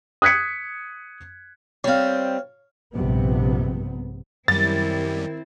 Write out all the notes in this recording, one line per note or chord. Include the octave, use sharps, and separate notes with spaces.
D#6 F#6 G#6 B6 C#7
G3 C4 C#5 F5
A#1 G2 C3 B3
F#2 D#3 G3 C4 E4 A6